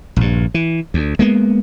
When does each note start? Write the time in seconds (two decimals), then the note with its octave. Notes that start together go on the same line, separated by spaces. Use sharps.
0.16 A#1 G2
0.54 E3
0.94 D2
1.19 G#3 A#3 B3